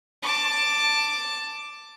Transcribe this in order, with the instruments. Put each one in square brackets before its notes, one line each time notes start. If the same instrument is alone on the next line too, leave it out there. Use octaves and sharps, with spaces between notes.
[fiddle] A5 D6